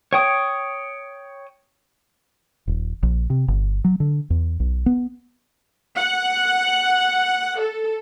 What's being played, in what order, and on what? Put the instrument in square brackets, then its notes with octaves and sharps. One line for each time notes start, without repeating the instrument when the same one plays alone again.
[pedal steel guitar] C#5 G5 D#6
[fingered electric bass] D#1
A#1
C3
G1
F#3
D3
E2
B1
B3
[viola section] F#5
A4